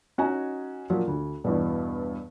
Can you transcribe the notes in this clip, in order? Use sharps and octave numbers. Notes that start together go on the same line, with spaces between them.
C#4 D#4 F#4 D#5 G#5 A#5
A#2 F3 F#3
D2
E2 G2 B2